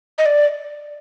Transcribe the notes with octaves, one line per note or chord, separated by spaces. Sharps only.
D#5
D5